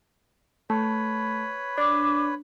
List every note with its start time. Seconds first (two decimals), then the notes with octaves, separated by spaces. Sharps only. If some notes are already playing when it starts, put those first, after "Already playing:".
0.70 A3 B4 C#5 B5
1.78 D4 D6